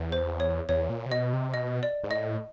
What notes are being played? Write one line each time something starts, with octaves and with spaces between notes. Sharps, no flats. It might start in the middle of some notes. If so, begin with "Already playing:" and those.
Already playing: E2
C5
C#5
E2 C#5
A#2
C3
B2 D#5
C3
B2 D#5
D5
G#2
A2 D#5